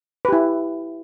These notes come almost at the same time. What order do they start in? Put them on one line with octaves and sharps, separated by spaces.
B4 G4 E4